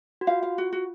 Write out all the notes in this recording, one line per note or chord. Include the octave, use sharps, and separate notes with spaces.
F#4
F4 F5
F5
F#4
F#4